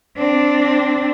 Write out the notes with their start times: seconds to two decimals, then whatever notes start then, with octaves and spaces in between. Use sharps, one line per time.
0.17 C4 D4